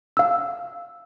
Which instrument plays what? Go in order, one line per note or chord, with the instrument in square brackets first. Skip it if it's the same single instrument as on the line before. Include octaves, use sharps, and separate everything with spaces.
[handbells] F5 E6